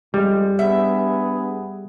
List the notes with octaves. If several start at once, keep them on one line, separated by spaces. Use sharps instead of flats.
F2 G3 G#3
G2 B3 G#4 E5